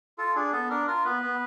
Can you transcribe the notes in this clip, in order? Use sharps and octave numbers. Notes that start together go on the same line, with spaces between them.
F4 A4
D4 G#4
B3 A4
D4 A#4
F4 A#4
B3 B4
B3